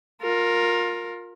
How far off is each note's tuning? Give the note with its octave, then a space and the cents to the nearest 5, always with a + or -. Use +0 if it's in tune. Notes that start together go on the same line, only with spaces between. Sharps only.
F4 +25 A#4 +0